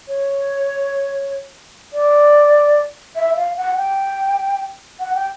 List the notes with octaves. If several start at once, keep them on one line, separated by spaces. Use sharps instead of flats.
C#5
D5
E5
F5
F#5
G5
F#5
G5